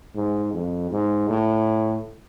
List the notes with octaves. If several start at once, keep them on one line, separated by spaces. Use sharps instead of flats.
G#2
F2
G#2
A2